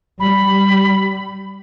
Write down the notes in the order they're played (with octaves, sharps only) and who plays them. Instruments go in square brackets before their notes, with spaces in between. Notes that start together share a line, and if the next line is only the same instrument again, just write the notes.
[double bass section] G3 [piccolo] B5